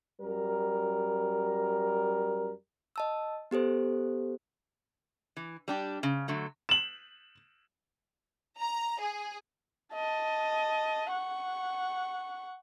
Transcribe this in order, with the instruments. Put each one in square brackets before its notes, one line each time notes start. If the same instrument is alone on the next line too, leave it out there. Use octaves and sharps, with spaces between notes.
[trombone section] F#2 G3 A#4
[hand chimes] D#5 A5 E6
B3 G4 A4 C5
[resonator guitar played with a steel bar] E3
G3 D4 G4
C#3
D3 F#3 A3
[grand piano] E7 F#7
[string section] A#5
G#4
[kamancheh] D#5 A5
F#5 C#6